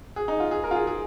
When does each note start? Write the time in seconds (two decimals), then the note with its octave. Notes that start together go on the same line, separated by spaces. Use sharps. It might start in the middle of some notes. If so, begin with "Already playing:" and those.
0.16 G#4
0.28 D#4
0.40 F4
0.51 G#4
0.64 A#4
0.71 F4
0.75 G#4
0.87 G#4